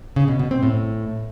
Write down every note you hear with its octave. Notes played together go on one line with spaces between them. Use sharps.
C#3
B2
B2
C4
A2